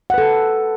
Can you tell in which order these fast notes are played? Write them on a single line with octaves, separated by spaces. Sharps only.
F#5 B4 A4